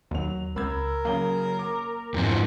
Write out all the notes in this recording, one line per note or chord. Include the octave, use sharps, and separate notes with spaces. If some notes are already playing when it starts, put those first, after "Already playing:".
D#2 F#3 F7
C#2 A#4 B5 E6 G#6
F#2 C#3 A#3 G7
D6
F2 G#2 E3 F3